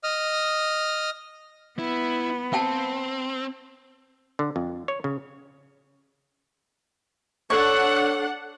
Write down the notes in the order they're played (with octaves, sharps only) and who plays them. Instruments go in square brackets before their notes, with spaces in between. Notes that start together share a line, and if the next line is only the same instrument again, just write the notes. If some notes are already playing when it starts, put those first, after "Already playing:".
[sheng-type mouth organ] D#5 D#6 F6
[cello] B3 [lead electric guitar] E4
[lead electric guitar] C4 [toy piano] F5 G5 A5
[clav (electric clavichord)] D3
F2
C#5
C#3
[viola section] D4 F#5 [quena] A4 [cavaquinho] C#5